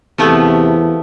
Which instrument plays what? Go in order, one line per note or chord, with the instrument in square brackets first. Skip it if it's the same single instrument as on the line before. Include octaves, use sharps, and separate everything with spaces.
[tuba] E2 [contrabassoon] C3 [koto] F3 A3 B3